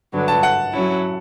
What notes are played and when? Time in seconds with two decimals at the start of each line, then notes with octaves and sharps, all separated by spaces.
0.13 G2 D3 F#3 B3 D4
0.28 A5
0.43 F#5
0.73 F#3 C#4 E4